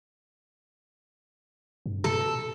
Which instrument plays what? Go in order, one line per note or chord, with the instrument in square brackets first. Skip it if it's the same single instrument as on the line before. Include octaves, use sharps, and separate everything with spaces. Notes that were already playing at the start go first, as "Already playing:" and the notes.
[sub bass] G2
[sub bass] B2 [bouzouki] A4